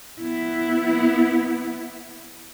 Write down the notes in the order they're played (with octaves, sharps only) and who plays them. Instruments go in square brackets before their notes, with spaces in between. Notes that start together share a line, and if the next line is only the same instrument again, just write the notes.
[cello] B3 E4